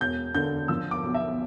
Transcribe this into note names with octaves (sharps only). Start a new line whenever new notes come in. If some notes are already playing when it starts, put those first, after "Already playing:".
E1 G6
D3 G6
F3 E6
D6
B1
E5